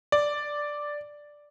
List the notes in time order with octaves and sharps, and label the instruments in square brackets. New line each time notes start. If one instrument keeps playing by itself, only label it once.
[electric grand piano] D5